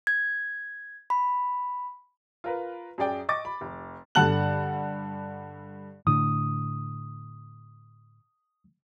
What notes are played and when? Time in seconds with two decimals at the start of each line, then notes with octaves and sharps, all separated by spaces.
0.07 G#6
1.10 B5
2.44 F4 A#4 B4
2.98 F#2 G#4 D5 G5
3.29 D#5 C#6 D6 A6
3.45 B5
3.61 F1
4.15 G2 D3 F#5 A5 F#6 F#7
6.07 A2 D3 D#6